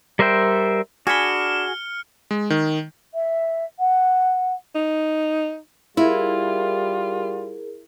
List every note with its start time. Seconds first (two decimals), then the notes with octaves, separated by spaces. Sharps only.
0.19 G3 A#4 C5 E5 G5
1.07 D4 F#4 G#4 G#5 B5 F6 C#7 G7
2.31 G#3
2.50 D#3
3.14 E5
3.79 F#5
4.75 D#4
5.97 G3 E4 F4 G#4 A#4